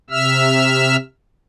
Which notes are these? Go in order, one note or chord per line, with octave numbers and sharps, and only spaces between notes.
C3 E5 E6 F6